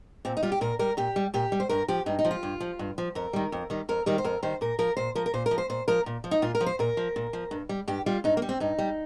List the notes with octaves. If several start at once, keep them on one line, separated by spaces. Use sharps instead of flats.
A#2 C4
D#4
G3 F4
G4
A#2 A#4
G3 A#4
A#2 G4
G3
A#2 G4
G3
C5
G2 A#4
F3 G4
G2 D#4
D#4
F3
F4
G2
F3
G2
F3
F2 A#4
D#3 G3
F2
D#3 G3
F2 A#4
D#3 G3 G4
C5
F2 A#4
D#3 G3 C5
A#2 A#4
F3 A#4
A#2 C5
F3 A#4
A#4
A#2 C5
A#4
F3
C5
A#2 C5
F3 A#4
A#2
F3
D#4
A#2 F4
A#4
F3
C5
A#2 A#4
F3
A#2
F3
G2
G3
G2 G4
G3 F4
G2 D#4
A#3
G3
C4
G2 D#4
G3